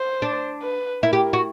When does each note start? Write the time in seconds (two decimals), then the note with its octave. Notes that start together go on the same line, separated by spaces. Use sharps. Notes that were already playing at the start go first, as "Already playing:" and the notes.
Already playing: C5
0.22 D4
0.63 B4
1.03 E4 A#4
1.13 G4
1.33 F#4